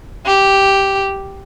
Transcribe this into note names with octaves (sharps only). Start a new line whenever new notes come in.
G4